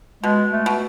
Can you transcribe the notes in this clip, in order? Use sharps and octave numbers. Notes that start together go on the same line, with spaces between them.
B2 G#3
A3
B2